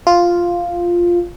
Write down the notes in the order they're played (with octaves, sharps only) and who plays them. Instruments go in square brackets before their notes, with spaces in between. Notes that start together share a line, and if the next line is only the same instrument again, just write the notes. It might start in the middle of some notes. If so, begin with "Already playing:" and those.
[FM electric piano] F4